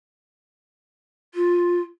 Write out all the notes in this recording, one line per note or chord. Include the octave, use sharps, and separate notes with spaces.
F4